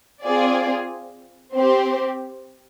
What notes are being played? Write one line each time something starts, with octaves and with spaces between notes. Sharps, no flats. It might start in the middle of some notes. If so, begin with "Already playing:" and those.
C4 F4 G#4 D5
C4 G4 C5